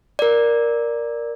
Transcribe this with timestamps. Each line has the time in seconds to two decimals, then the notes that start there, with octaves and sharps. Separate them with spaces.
0.19 A#4 D5